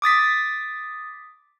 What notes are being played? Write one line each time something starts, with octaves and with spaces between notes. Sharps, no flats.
D6 D#6 A6 B6